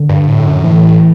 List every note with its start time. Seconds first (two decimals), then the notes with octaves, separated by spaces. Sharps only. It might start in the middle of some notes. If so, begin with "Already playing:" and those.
Already playing: D3
0.09 G2
0.28 A2
0.46 F#2
0.64 A2 E3